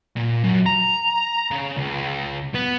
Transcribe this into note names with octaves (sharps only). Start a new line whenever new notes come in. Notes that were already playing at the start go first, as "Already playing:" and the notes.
A#2
F#2
A#5
C#3
C#2
B3